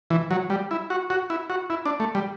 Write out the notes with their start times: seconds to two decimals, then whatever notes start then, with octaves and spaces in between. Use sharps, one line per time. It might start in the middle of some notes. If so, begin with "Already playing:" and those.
0.10 E3
0.31 F#3
0.50 G3
0.71 E4
0.90 F#4
1.10 F#4
1.30 E4
1.50 F#4
1.70 E4
1.86 D4
2.00 A3
2.15 G3